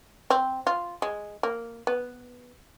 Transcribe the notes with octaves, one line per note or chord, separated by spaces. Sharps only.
C4
F4
G#3
A#3
B3